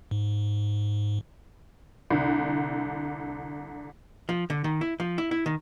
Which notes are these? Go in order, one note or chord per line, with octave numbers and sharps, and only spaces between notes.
G#2
C2 D3
F3
D3
D#3
E4
F3
E4
E4
D#3